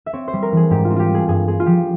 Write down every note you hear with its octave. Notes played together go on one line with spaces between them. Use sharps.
E5
C4 C#5
C5
G3
A#4
E3 G#4
G#2 G4
F4
C4
F4 G4
G3 G#4
G2 G#4
C4 G#4
F4
F3 G4